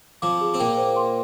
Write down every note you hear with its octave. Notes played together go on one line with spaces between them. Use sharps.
F2 F3 D6
G#4
C4
A#2 A#3 G5
C5
C6